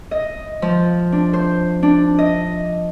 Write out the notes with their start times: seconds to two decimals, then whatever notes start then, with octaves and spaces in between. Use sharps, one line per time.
0.11 D#5
0.62 F3
1.12 D4
1.33 C5
1.83 D4
2.19 D#5